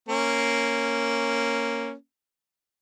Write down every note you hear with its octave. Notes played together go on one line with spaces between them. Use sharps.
A#3 C#4